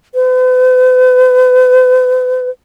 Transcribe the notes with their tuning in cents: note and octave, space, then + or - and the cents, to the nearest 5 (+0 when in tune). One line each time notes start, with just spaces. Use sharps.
B4 +45